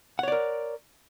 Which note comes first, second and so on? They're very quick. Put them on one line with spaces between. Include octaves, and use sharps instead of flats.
F#5 C#5 D5 A#4